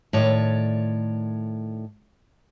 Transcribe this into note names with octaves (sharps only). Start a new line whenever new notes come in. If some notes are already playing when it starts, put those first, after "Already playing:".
A2 D#3 C#5 D5